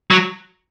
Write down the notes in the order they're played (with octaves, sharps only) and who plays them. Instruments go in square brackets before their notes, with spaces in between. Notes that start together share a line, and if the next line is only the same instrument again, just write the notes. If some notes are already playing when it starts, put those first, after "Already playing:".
[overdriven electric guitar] F#3